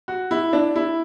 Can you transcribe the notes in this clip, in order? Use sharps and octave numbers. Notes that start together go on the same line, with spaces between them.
F#4
E4
D4
E4